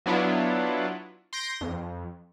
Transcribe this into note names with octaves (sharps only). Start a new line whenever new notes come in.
F#3 B3 D4 E4 F4
C6 G6 A#6 D7
F2